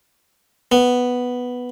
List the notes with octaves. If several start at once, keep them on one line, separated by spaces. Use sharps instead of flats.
B3